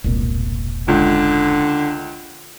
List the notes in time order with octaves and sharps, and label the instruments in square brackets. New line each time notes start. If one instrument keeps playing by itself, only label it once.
[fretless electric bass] E1 C2 A#2
[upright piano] C#2 [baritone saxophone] D3